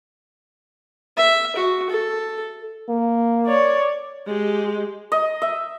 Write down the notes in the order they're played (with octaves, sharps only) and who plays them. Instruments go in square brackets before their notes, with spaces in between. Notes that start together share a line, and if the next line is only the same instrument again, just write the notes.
[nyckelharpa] E5
F#4
A4
[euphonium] A#3
[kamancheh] C#5 D5
[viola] G#3 G4
[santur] D#5
E5